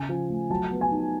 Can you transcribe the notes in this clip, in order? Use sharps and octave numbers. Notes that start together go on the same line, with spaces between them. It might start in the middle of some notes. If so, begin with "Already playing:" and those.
Already playing: C#3 G#5
F3
A3
F#3 A5
B3
G#5
D#4